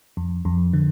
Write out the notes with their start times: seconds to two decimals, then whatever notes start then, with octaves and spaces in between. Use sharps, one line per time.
0.17 F2
0.45 F2
0.73 D3